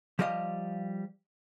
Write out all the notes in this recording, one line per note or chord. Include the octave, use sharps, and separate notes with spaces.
F3 G3 G4 D#5 F5